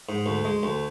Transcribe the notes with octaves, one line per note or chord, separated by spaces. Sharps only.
G#2
D2
G#3
D2